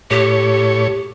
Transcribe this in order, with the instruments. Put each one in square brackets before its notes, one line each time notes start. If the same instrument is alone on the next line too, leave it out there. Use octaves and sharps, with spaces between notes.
[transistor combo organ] A2 C#5 [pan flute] G4